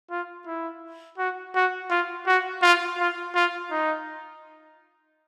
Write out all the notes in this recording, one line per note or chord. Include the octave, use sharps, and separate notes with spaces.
F4
E4
F#4
F#4
F4
F#4
F4
F4
F4
D#4